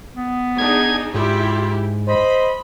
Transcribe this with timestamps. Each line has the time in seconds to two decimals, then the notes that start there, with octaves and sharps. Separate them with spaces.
0.15 B3
0.58 D4 D#4 G#4 G#6
1.14 G#2 E4 F4 G4
2.08 C5 D#5 B5